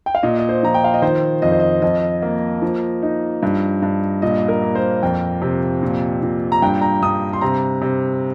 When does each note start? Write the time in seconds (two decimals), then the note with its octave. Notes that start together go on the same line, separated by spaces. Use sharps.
0.06 G5
0.15 F5
0.23 A#2 D#5
0.39 D#5
0.49 C5
0.63 F3 A#5
0.74 G5
0.84 F5
0.94 D#5
1.02 D#3 C5
1.42 F2 D#5
1.52 C5
1.60 D#5
1.82 F2 D#5
2.22 A#3
2.62 F3
3.03 D#4
3.43 G2
3.83 G2
4.22 A#2 D#5
4.48 A#4
4.62 A#3
4.75 C5
5.03 F2 G5
5.42 C3
5.83 A#2
6.23 A#2
6.52 A#5
6.62 G2 G5
6.81 A#5
7.02 G2 D#6
7.33 C6
7.41 C3 A#5
7.82 C3